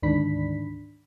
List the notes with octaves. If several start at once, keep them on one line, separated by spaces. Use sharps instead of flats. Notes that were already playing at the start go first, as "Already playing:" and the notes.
D2 G#2 D#3 D4 B5 B6